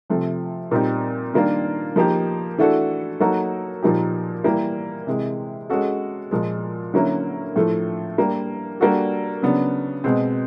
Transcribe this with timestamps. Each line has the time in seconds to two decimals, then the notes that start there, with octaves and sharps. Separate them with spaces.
0.10 C3 F3 A3
0.71 A#2 G3 C4 D#4 G4
1.34 D#3 G3 A#3 D4 F4
1.96 F3 A#3 D#4 G4
2.58 E3 A3 D4 F#4 A4
3.20 F#3 A#3 D#4 F#4 A4
3.83 A#2 F3 A#3 D#4 G4
4.44 E3 G3 A#3
5.07 C3 E3 G#3
5.70 G#3 C#4 F#4 A4
6.31 A#2 F3 G#3
6.94 D3 F#3 A#3 C#4 E4
7.56 A2 F3 A3
8.18 G3 A#3 D4
8.80 G3 A#3 D4 F#4 A4
9.42 C#3 F#3 B3 D4
10.04 B2 G#3 C4